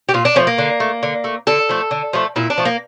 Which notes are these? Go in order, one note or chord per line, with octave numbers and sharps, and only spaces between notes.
G4
A#2 F4
D4
F3 A3 C#4
A#3
D3
A3
D3
A3
D3 A4
F3 A3
D3
F3 A3
A#2 E4
D4
F3 A3
A#3